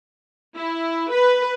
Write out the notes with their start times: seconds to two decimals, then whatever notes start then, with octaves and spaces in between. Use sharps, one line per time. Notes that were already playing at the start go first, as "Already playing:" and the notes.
0.57 E4
1.12 B4